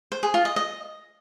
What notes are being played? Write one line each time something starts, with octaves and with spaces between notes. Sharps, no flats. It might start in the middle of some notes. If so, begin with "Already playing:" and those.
C5
G#4
F4
D#5
D#5